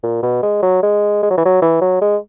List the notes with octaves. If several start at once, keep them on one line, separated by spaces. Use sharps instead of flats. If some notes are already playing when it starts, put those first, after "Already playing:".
A#2
B2
G#3
F#3
G#3
G#3
F#3
E3
F#3
E3
F#3
G#3